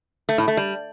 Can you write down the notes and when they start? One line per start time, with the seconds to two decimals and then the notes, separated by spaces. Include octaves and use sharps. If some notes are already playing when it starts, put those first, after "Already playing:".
0.29 A3
0.38 A2
0.48 A3
0.57 G3